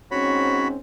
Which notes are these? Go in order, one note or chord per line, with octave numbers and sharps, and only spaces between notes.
G#2 C4 C#4 F#4 C#5 B5